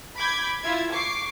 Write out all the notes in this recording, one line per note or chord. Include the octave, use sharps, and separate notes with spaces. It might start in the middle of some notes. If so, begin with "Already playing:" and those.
B5 D6 G6 G#6
E4 F4 E5 G#6
C#6 D6 C7